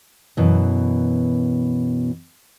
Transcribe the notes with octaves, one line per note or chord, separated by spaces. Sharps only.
F#2 B2 E3